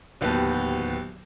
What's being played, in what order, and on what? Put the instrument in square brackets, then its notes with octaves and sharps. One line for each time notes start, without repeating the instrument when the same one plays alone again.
[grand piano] D1 D#2 B3 F#4 G4 A5